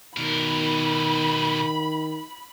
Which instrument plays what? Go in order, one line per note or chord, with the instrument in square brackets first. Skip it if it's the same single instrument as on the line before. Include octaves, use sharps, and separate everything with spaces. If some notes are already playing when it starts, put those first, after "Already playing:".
[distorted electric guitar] B2 A#4 [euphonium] D#3 [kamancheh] B5